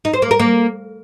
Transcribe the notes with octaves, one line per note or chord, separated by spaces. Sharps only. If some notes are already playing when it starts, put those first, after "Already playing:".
D#4
C5
A#3
A#4
A#3